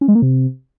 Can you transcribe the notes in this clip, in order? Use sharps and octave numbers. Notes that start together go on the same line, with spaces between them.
C#4
G#3
A#3
C3